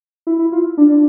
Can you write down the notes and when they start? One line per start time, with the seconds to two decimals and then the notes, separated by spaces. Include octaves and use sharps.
0.27 E4
0.39 E4
0.52 F4
0.77 D4
0.89 D4